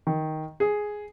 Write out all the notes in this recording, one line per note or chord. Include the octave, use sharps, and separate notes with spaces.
D#3
G#4